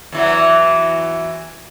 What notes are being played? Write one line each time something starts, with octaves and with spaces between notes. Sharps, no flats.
E2 E3 F#3